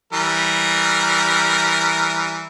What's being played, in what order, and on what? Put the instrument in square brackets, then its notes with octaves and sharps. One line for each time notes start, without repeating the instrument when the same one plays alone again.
[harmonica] E3 G3 A#4